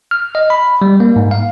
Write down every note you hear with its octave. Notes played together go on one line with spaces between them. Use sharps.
F6
D#5
B5
G3
A#3
G#2
F5